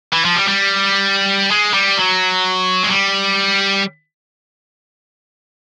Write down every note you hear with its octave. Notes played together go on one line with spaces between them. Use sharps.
E3
F3
G3
G3
G#3
G3
F#3
G#3
G3